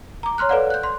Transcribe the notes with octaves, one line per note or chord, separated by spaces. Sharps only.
A#5 D6
C#5 A#5 C6 F6 F#6
A4 B4 C#5 D5 F5 F#5
F#6 G6
C6